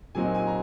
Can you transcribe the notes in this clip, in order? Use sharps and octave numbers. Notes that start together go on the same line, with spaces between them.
A#2 F#3 C4 D#4 G#5
G#5
A#5